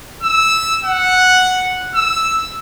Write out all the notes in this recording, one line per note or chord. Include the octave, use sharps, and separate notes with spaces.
E6
F#5
E6